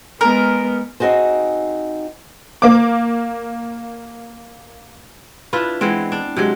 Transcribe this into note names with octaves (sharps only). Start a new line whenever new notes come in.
G#3 B3 A#4
C4 D#4 F#4 G#4 C5
A#3 D6
D4 E4 F4 B4
E3 G#3 B3 C4
D4
C3 F#3 G#3